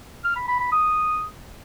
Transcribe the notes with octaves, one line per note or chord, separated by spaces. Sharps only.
F6
B5
B5
B5
D#6